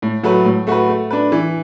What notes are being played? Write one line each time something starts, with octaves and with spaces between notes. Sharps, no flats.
A2
F#3 A3 F#4 B4
A2
A3 F#4 B4
A3
D4 B4
E3